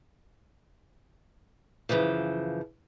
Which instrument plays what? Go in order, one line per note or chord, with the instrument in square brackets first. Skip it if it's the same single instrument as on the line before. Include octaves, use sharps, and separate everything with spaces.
[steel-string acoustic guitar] F#2 A#2 C#3 E3 F3